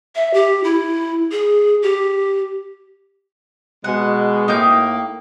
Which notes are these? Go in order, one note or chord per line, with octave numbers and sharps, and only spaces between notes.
E5
G4
E4
G#4
G4
B2 G#3 F#5
A2 A#3 D#4 G4 G6